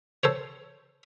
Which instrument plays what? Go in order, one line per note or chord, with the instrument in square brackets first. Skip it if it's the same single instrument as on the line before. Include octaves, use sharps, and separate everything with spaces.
[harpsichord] A4 C5 C#5